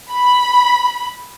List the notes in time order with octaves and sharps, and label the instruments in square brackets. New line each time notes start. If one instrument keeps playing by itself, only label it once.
[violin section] B5